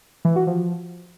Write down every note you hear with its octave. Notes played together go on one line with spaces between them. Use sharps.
E3
F#4
F3